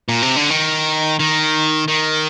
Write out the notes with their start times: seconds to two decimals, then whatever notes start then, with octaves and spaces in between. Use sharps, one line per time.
0.09 A#2
0.22 C3
0.36 D3
0.51 D#3
1.20 D#3
1.88 D#3